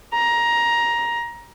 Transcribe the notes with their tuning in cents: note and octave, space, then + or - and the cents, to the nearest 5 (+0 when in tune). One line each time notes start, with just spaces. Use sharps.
A#5 +15